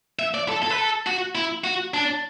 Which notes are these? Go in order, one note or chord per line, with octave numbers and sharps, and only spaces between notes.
E5
D5
A4
A4
B4
A4
F#4
E4
F#4
D4